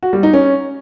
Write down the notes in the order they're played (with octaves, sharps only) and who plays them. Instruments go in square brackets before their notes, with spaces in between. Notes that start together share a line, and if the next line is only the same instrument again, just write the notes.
[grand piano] F#4
G3
D#4
C#4